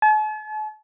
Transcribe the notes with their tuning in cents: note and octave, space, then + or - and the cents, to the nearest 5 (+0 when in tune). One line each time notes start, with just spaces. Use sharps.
A5 -45